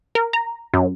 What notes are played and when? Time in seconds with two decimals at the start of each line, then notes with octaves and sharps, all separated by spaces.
0.15 A#4
0.33 A#5
0.74 F#2